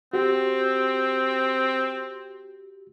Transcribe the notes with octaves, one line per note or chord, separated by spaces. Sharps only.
C4 F#4 G4